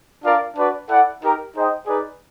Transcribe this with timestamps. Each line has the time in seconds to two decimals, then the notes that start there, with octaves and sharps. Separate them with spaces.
0.24 D4 F4 A#4 D5 F5
0.56 D4 F#4 B4 D5
0.89 E4 A4 D5 F#5
1.22 D#4 G4 A#4
1.54 D#4 G#4 C5 D#5 G5
1.87 D#4 G#4 B4 D5